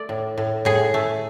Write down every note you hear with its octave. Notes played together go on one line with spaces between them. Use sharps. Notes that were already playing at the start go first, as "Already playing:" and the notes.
Already playing: A3 D5
A2
A2
A2 G#4
A3